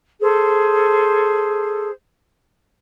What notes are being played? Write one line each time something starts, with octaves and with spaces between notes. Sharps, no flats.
G#4 A4 C5